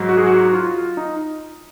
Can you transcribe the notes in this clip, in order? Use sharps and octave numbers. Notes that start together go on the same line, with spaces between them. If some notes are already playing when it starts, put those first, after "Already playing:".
Already playing: G#2 F#3
F#4
G#4
F#4
F4
D#4